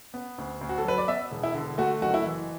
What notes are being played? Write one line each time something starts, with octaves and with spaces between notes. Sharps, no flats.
B3
D2
D2
F#4
A4
F#3 B4
D5
B3 E5
E1
E4
D3
A3 F#4
F#1 F#4
E4
E3